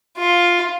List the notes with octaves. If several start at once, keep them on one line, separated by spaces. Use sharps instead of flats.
F4